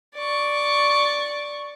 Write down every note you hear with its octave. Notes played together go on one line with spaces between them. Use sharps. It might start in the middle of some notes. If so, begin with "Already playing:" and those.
D5 C#6